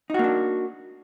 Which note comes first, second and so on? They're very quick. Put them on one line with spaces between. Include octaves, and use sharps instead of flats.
D#4 F#4 A#3 D4